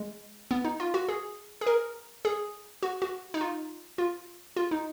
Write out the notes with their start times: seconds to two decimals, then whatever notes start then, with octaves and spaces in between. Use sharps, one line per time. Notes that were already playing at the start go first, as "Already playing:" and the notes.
Already playing: G#3
0.51 B3
0.65 D#4
0.80 F4
0.94 F#4
1.09 G#4
1.61 G#4
1.66 A#4
2.25 G#4
2.83 F#4
3.02 F#4
3.34 D#4
3.41 F4
3.98 F4
4.56 F4
4.71 D#4